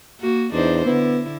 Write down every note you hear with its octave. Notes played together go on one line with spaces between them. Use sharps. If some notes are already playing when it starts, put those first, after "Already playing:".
A#3 F#4
E2 D4 D#4 C5
D3 B3 E4